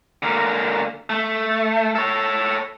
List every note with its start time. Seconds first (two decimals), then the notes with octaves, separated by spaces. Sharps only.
0.23 D3 A#3
1.10 A3
1.95 A4 C#5